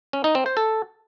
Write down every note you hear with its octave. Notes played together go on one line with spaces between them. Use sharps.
C#4
D#4
C4
C5
A4